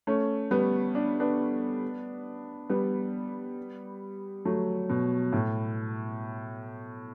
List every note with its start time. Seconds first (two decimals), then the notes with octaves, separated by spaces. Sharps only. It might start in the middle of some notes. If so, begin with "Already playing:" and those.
0.07 A3 C#4
0.51 G3 B3
0.95 D4
1.20 B3 D4
2.69 G3 B3
4.45 F#3 A3
4.89 B2
5.32 A2